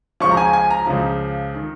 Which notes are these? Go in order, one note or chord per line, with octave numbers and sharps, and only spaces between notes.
C#2 C#3 F3 C#6
A#5
G#5
G#5
A#5
C#2 C#3 F3
D#3